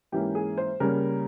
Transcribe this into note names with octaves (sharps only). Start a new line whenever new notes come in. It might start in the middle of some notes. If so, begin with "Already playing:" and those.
G#2 E3 A#3 C#4 G4
G#4
C5
C#3 G3 A#3 C#4 A#4